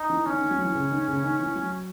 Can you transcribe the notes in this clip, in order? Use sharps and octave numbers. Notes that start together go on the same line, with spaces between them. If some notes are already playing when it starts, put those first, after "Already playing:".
Already playing: D#4
E3
D#3 C#4
D#3
F#3
E3
C#3
D#3
C#3
D#3
E3
F#3